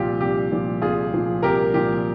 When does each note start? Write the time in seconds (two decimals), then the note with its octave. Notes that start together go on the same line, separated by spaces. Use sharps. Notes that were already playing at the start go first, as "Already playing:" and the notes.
Already playing: C2 A#2 F3 F4 G4
0.21 C2 G4
0.52 A#2 F3
0.82 C2 F4 G#4
1.13 A#2 F3
1.43 C2 G4 A#4
1.74 A#2 F3 G4